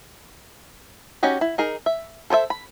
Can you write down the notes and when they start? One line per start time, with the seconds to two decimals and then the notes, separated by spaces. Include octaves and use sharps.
1.23 C#4 D#4 F#4 G4 D#5
1.41 E4
1.58 D#4 G#4 A#4
1.86 E5
2.30 A4 C5 C#5 E5
2.50 B5